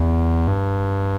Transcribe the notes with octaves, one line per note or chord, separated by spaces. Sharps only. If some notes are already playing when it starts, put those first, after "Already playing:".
Already playing: E2
G2